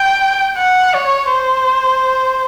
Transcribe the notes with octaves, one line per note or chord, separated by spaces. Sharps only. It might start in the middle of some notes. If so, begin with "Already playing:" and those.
Already playing: G5
F#5
C#5
C5